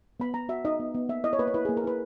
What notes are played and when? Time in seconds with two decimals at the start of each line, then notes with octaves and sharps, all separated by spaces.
0.20 B3 B5
0.34 B3 A#5
0.49 F#4 E5
0.65 D#4 D#5
0.80 B3
0.94 B3
1.09 A#3 E5
1.24 E4 D#5
1.33 C#5
1.39 A#3 B4
1.47 C#5
1.54 E4 B4
1.65 G#4
1.69 A#3
1.77 A#4
1.84 E4 B4